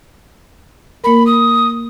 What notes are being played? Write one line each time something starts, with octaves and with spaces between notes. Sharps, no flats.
A#3 A#4 B5
D#6